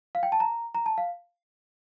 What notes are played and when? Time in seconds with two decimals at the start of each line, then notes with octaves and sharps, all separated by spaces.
0.15 F5
0.23 G5
0.32 A5
0.40 A#5
0.75 A#5
0.86 A5
0.98 F5